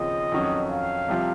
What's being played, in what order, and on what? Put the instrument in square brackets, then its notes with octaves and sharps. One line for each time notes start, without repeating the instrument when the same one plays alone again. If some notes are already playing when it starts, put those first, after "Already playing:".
Already playing: [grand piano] D#2 C#3 F3 C4 [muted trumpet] D#5
[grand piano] F2 D#3 F#3 C#4
[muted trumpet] F5
[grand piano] C2 C3 F3